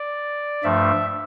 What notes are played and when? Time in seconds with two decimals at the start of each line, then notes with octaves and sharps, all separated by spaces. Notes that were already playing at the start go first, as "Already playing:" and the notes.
Already playing: D5
0.64 G2 F3 A3 E5